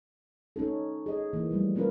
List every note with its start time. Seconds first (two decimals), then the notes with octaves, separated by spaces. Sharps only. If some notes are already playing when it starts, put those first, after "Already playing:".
0.56 C#4 D#4 A4
1.06 G#4 D#5
1.33 E3 A#3
1.50 F3 G3 A3
1.75 A#3 B3 C#4 F4 A#4 B4